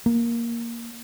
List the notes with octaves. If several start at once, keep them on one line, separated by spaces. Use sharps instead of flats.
A#3